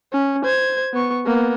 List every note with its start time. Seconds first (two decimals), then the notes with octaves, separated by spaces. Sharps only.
0.13 C#4
0.45 C5 G#6
0.93 B3 C#6
1.26 A#3 B3